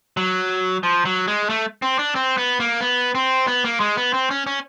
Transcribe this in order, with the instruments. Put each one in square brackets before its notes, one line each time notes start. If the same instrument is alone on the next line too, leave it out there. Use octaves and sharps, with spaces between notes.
[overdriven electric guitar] F#3
F3
F#3
G#3
A3
C4
D4
C4
B3
A#3
B3
C4
B3
A#3
G#3
B3
C4
C#4
C#4